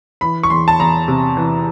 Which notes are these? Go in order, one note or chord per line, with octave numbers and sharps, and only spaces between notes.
E3 B5
C#6
E2 C6
A5
E2 A#5
C3
E3